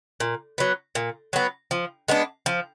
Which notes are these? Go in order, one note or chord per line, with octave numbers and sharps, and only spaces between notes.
A#2
F#3 B3
A#2
F#3 B3
F3
G#3 B3 D4
F3